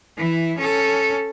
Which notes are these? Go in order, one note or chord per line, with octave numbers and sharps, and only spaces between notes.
E3 E4
C#4 A4